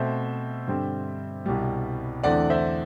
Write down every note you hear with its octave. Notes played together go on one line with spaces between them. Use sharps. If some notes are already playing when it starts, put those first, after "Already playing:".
Already playing: B2 A3 C4 C5 E5
G2 D3 G3 C4
C2 B2 G3
E2 D3 A3 C4 D5 F#5
C5 E5